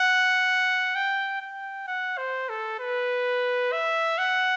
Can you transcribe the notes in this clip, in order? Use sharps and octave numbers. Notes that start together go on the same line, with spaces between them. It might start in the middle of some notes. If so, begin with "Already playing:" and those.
Already playing: F#5
G5
G5
F#5
C5
A4
B4
E5
F#5